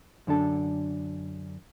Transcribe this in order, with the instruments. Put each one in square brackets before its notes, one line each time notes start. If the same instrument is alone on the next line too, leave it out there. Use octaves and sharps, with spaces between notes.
[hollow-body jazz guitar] F#2 D3 D4 A4